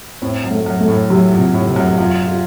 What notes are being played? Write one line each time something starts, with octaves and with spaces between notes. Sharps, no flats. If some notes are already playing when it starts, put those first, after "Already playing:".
A2 C4
F#2
A3
F#2
A3
A2
C3 F#3
A#2
C3
A2
C3
F#2
F#2 F4
F4